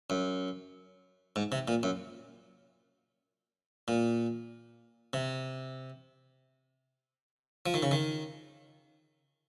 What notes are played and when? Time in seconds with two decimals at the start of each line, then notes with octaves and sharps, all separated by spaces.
0.10 F#2
1.36 G#2
1.52 C3
1.68 A#2
1.83 F#2
3.88 A#2
5.13 C3
7.66 F3
7.74 D#3
7.83 C#3
7.91 D#3